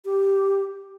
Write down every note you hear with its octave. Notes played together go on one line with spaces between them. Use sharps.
G4